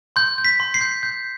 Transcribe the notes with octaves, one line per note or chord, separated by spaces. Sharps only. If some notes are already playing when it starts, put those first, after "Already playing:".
C6 G6
G6
B6
C6
C7
G6
G6